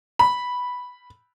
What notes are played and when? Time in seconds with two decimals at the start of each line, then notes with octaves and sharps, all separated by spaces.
0.19 B5